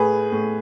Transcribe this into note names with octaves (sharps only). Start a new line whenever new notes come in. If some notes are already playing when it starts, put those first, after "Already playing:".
Already playing: A2 G#4 B4
A2